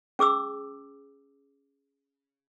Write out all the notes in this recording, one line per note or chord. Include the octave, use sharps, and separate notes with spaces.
C#4 G#4 D6 E6